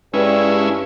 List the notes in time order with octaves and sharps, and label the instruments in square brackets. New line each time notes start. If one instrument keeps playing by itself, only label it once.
[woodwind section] G2 [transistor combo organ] G#3 C#4 E4